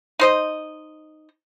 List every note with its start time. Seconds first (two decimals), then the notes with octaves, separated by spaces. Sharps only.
0.19 D#4 C5 D#5